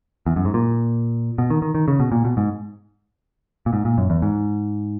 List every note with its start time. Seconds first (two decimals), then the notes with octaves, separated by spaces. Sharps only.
0.26 E2
0.36 F#2
0.45 G#2
0.54 A#2
1.38 B2
1.50 D#3
1.62 D#3
1.75 D#3
1.88 C#3
2.00 B2
2.12 A#2
2.25 B2
2.37 G#2
3.66 A#2
3.73 G#2
3.85 A#2
3.98 F#2
4.10 E2
4.22 G#2